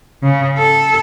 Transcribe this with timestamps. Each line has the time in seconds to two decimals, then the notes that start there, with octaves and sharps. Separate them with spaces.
0.23 C#3
0.58 A4